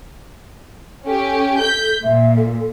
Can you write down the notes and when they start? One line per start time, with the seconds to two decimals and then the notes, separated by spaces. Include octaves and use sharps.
1.06 C#4 G4 A4
1.59 A4 G6 B6
2.03 A#2 E5
2.36 A4